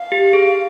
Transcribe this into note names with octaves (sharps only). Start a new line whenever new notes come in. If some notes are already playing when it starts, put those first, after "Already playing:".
Already playing: F5
G4
G#4